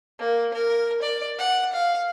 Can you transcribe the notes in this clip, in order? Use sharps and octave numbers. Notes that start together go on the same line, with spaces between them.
A#3
A#4
D5
F#5
F5